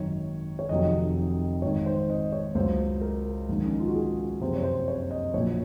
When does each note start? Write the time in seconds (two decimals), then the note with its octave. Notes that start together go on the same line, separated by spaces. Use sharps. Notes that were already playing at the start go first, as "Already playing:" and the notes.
Already playing: G#1 F#2 D#3 C#5
0.59 C#5
0.69 F1 F2 C3 D#3 F#3 D#5
1.62 G#1 G#2 D#3 C#5
1.86 C5
2.10 D#5
2.32 C#5
2.55 C#2 C#3 F#3 C5
3.01 A#4
3.49 A#1 G#2 D#3
3.66 C#4
3.73 D#4
3.80 F4
3.87 F#4
3.95 G#4
4.41 F#1 F2 C3 C5
4.56 C#5
4.64 C5
4.88 C#5
5.11 D#5
5.34 A#1 A#2 F#3 C#5